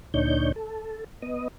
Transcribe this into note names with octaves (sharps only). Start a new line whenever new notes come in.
D2 A#2 D4 D#4 C#5 G6
A4
B3 D#5